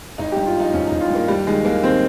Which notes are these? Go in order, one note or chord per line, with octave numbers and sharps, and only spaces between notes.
G#1 D#4
G4
G2
F4
F3 D#4
G#1 C#4
G#1 D#4
F4
G2 A#3
D#2 G3
D#3 G#3
D#2 A#3
D#3 C4